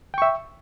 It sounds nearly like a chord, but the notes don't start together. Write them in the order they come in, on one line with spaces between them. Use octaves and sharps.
G5 C#6 E5